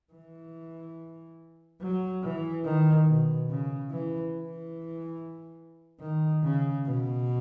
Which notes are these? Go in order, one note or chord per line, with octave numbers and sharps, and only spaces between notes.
E3
F#3
E3
D#3
B2
C#3
E3
E3
D#3
C#3
B2